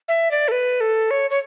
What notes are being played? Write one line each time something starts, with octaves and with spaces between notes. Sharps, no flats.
E5
D5
A4
B4
A4
C#5
C#5